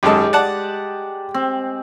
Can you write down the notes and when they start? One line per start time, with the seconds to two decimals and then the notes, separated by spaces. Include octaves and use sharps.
0.03 G#1 F#2 G#3 G4 A4
0.33 D5 F#5 A5
1.34 C4